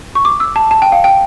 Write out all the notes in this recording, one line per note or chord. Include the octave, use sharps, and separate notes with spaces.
C#6
D6
E6
A5
A5
G5
F5
G5